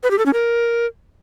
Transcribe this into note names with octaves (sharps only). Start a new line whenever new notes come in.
B4
G4
A4
C#4
A#4